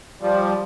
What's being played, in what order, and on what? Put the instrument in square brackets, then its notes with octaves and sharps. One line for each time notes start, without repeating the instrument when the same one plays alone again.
[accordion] F3 G3